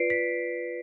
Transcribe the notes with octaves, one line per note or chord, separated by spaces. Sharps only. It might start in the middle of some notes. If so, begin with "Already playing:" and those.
Already playing: F4 B4 D5 C7 D7
B6